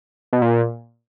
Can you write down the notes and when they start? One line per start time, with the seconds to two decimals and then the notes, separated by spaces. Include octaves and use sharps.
0.33 B2
0.42 A#2